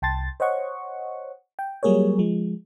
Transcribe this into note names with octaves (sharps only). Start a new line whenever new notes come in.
C2 G5 A5 C6 A6
C5 C#5 D#5 F#5 C#6
G5
F#3 G3 A#3 G#4 A#4 C#5
F3 G#3